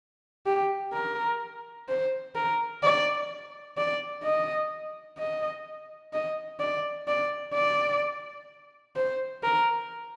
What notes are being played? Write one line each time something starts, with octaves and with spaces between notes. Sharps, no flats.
G4
A#4
C5
A#4
D5
D5
D#5
D#5
D#5
D5
D5
D5
C5
A#4